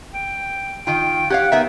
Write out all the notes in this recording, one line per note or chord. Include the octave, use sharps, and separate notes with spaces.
G5
D#3 F4 G5
G4 C#5 F5 F#5
B3 D#4 A#4 E5